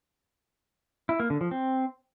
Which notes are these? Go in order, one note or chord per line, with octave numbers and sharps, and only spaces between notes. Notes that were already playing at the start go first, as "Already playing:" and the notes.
E4
A#3
D3
F3
C4